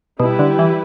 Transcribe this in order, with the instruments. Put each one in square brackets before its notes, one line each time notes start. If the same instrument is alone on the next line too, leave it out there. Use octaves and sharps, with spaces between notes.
[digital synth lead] B2 [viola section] G3 E4 G4 B4
[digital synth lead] D3
E3